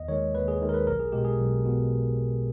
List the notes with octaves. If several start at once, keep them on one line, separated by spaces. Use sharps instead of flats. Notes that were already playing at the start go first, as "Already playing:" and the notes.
Already playing: D#2 D#5
D#3 G#3 C#5
D#2 B4
G#4
D#3 G#3
A#4
B4
B1 A#4
G#4
B2 G#3 G4
G#4
B1
B2